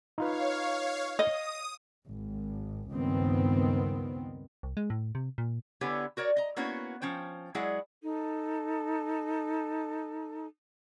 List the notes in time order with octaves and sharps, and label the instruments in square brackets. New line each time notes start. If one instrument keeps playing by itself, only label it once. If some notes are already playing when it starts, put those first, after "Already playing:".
[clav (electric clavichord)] D#4 F4 B4 [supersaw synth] C#5 F5
[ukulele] D#5 [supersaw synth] D#6
[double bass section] G#1
C#2 G2 D#3 B3 C4
[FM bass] C2
G#3
A2
C3
A#2
[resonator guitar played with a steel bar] D3 B3 E4 G4 C#5 G#5
F#4 A#4 C#5 D5
D#5 A#5
A#3 B3 C#4 E4 F#4 C#5
F3 C#4 C5 G5
F#3 G#3 E4 G#4 D5 F#5
[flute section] D#4 A4